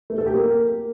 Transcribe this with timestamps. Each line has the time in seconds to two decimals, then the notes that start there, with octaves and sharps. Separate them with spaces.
0.10 A3
0.18 A4
0.26 G4
0.34 A#3